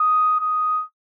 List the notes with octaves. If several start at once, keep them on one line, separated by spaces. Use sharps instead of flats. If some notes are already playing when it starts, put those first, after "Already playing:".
Already playing: D#6
D#6